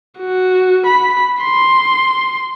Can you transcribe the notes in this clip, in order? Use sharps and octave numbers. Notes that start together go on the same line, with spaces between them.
F#4
B5
C6